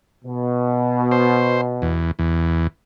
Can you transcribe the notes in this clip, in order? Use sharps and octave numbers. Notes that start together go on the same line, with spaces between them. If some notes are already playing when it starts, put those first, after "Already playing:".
B2
C5
E2
E2